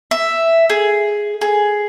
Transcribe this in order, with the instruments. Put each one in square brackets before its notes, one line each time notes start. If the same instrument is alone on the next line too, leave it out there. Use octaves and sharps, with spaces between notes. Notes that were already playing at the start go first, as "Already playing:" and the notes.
[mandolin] E5
G#4
G#4